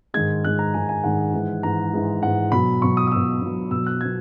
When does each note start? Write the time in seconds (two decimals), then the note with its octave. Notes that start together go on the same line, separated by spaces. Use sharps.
0.14 G#2 D#3 G#3 G#6
0.44 G#2 D#3 G#3 F#6
0.59 A#5
0.74 G#2 D#3 G#3 G#5
0.89 G#5
1.04 G#2 D#3 G#3 F#5
1.33 G#2 E3 G#3
1.63 G#2 E3 G#3 A#5
1.93 G#2 E3 G#3
2.22 G#2 E3 G#3 F#5
2.52 B2 F#3 B5
2.82 B2 F#3 C#6
2.97 D#6
3.07 D#6
3.12 B2 F#3 E6
3.42 B2 F#3
3.71 B2 E6
3.76 F#3
3.87 F#6
4.01 B2 F#3 G#6